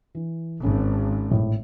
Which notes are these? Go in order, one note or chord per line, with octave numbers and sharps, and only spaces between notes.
E3
G#1 C#4
A2